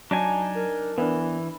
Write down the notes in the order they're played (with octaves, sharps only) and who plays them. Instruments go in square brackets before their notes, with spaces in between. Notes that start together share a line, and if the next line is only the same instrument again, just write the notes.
[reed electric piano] F#3 [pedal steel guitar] D4 D#4 G#5 [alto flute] A5
[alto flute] A#4
[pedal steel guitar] E3 [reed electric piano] B3 D4